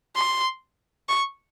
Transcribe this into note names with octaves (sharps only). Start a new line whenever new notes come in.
C6
C#6